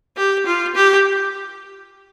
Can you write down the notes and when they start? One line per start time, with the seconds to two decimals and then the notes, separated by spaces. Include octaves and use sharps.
0.17 G4
0.46 F4
0.75 G4